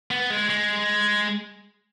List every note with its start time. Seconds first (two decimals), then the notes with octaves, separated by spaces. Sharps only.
0.11 B3
0.30 G#3
0.49 G#3